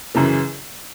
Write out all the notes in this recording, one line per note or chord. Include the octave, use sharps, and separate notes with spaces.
F#2 C#3 E3